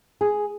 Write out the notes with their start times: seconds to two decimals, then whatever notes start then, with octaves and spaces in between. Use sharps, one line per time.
0.21 G#4